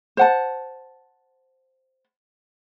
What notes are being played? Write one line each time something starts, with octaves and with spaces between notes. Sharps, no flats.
C5 F#5 A5